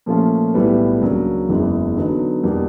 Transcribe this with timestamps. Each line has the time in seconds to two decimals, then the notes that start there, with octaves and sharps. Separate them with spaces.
0.06 A#2 F3 A3 C#4 F4
0.54 B1 A2 E3 G3 B3
1.01 C#2 C#3 F#3 A#3 D4
1.48 F#1 E2 C#3 E3 G#3
1.96 D3 F#3 B3 D#4
2.43 E2 B2 G3 A#3